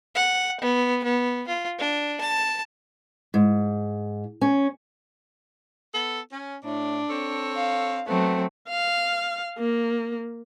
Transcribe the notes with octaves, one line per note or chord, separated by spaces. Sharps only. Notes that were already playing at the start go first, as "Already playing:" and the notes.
F#5
B3
B3
F4
D4
A5
G#2
C#4
B3 A4
C#4
A2 D4
C4 A4 C#5
F5
F#3 A3 B3 C4
F5
A#3